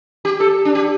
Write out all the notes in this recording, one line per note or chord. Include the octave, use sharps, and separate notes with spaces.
G4
A4
D4
G4